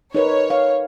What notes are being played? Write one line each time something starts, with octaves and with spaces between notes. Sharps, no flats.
D#4 A#4 B4 C#5
F5